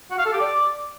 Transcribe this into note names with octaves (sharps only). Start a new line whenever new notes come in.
F#4
F5
A4
G4
D5